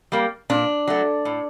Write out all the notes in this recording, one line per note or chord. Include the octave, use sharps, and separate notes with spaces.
G3 A#3
A#2 D4
F#3 A3
A2